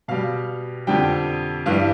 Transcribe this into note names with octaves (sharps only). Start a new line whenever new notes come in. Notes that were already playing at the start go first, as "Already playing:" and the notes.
B2 G3 F5
F2 D3 G3 G5
G2 E3 G3 F5